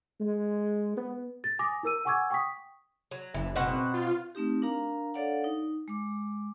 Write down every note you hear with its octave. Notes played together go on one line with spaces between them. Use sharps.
G#3
B3
A6
G#5 D6 D#6 A#6
E4 A#4 E6 D#7
F#5 G#5 C#6 D6 E6 G#6
G5 C#6 D#6 B6
F#3
F#1 E3
B2 C4 F#5
F4
A3 C4 D#4 G4
D4 A#4 F5 A#5
D4 A4 C#5 D5 F5 F#5
D#4
G#3 D6